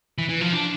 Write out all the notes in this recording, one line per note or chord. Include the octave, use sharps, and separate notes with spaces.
E3
E3
F3
D4